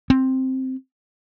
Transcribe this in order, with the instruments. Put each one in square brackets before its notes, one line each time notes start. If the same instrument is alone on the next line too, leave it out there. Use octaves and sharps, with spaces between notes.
[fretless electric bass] C4